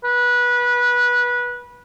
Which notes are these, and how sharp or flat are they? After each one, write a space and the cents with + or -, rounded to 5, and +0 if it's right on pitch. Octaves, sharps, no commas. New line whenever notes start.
B4 -20